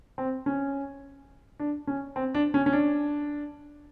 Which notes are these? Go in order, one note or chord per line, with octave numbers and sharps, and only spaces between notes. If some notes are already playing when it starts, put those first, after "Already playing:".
C4
C#4
D4
C#4
C4
D4
C#4
C#4
D4